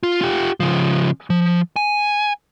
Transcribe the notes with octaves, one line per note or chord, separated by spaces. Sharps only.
F4
F4 G4
C#3 F3
F3
G#5